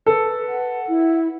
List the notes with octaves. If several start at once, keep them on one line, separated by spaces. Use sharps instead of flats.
A4 B4
F#5
E4